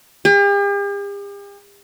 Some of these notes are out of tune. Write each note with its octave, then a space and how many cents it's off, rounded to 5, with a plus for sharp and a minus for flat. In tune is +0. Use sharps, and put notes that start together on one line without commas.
G4 +45